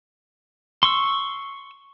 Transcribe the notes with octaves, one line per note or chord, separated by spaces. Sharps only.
C6 C#6 E6